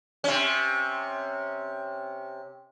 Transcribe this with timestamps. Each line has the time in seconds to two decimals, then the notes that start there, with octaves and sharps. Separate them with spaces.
0.24 C3 C#4